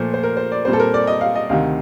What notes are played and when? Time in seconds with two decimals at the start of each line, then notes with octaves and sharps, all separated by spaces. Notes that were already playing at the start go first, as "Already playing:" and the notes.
Already playing: A#2 F3 A3 C5
0.14 C5
0.23 A#4
0.37 C5
0.51 D5
0.65 A#2 G3 C4 C5
0.73 A4
0.80 A#4
0.94 D5
1.07 D#5
1.21 F5
1.36 D#5
1.49 D2 C3 D#3 F5